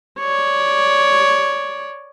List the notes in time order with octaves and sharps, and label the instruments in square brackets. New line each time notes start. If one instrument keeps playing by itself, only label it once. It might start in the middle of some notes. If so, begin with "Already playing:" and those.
[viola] C#5 D5